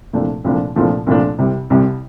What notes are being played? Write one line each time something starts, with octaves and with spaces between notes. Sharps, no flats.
C2 A#2 F3 A3 D4
C2 A#2 F3 A3 D4
C2 A#2 F3 A3 D4
C2 A#2 F3 A3 D4
C2 C3 G3
C2 C3 G3